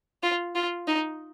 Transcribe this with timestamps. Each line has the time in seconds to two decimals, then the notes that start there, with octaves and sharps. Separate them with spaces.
0.23 F4
0.55 F4
0.88 D#4